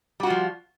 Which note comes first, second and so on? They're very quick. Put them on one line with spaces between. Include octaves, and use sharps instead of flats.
G3 F#4 F4 F3